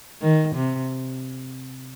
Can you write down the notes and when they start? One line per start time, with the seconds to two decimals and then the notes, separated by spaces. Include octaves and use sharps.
0.22 D#3
0.55 C3